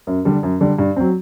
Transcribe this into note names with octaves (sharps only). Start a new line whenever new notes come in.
F#2
D3 G3
F#2
D3 G3
G2
F#3 C4